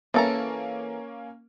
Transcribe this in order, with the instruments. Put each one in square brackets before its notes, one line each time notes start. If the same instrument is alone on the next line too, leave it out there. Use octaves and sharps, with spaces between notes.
[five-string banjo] E3 A4 A#5 [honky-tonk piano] A#3 C#4